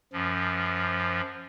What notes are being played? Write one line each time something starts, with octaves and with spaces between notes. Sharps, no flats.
F#2 F3